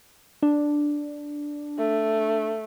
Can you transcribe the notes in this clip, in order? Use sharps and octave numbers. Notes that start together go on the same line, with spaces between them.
D4
A3